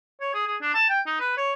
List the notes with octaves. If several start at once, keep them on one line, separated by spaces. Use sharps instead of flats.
C#5
G#4
G#4
D4
A5
G5
D#4
B4
C#5